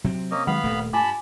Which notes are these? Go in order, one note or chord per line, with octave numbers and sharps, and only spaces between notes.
C3 F#3 C4
A#3 C#4 D#5
D#3 F#3 G#3 B3 F5 F#5 B5
D#1 A#2 A3
G2 F4 G#5 A5 B5 D6